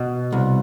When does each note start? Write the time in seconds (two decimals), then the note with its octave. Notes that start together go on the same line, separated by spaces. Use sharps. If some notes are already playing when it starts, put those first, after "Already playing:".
Already playing: B2
0.32 C2